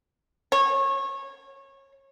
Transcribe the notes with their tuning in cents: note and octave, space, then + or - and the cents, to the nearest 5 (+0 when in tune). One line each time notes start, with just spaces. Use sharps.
C#5 -25